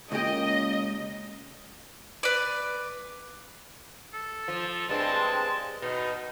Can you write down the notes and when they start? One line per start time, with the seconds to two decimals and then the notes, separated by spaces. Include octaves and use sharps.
0.12 C#2 A#3 C#4 G4 D#5
2.23 B4 D5
4.13 A4
4.48 F3
4.89 G2 G#3 C4 A5
5.82 B2 D#4